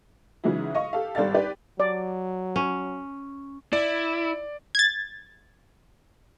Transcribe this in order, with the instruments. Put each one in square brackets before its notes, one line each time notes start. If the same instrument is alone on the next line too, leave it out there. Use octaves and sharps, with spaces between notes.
[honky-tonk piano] C#3 E3 F#3 G#3 D#4 E4
D#5 F5 C#6
G4 A4 F5
G#1 G3 A4 D5 F5 A6
G4 B4 D5
[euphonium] F#3 [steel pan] D5
[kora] C#4
[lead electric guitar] E4 [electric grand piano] D5
[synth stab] G#6 A6